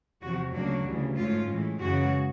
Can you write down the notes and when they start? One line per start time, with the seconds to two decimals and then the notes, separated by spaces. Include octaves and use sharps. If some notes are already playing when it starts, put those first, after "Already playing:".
0.22 E2 C3 F3 F#4
0.53 D2 C#3 F#3 A#3 D4 F#4
0.85 D2 C#3 E3 G3
1.17 G#2 F3 A3 C#4 F4
1.49 A2 E3 G#3
1.79 F#2 C#3 E3 G#3 F#4